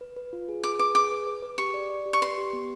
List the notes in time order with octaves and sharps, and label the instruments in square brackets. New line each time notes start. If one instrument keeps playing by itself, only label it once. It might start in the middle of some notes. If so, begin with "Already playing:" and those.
[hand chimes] B4
B4
F4
G#4
[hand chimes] G#4 [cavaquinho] D6
[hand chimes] B4 [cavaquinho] D6
[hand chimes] G#4 [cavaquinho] D6
[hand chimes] B4
B4
B4
[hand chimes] G4 [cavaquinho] C#6
[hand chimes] D5
D5
G4
[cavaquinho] C#6
[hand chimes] B4 [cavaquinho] C6
[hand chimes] G4
B3